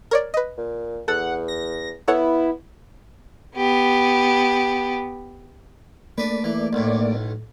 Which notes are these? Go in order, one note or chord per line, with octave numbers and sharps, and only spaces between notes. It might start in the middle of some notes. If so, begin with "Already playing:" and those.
A#4 C#5 D5
B4 D#5
A#2
E2 A4 F#5
A#6
B3 E4 A4 C#5 F#5
B3 G4
A3 A#3 D4 B4 D5
E3
B1 A2